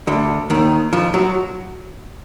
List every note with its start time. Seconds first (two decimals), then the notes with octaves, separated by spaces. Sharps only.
0.07 D2 D3
0.50 D#2 D#3
0.93 F2 F3
1.14 F#3